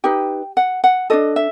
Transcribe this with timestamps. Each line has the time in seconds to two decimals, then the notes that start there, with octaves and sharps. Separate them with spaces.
0.04 D#4 G4 B4 G5
0.57 F#5
0.84 F#5
1.10 D4 F#4 A4 D#5
1.36 E5